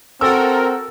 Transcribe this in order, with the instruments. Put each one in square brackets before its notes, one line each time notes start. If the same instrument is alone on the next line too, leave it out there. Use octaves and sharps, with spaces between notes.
[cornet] C4 [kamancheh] F#4 A4 [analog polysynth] A#4 [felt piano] E6 A6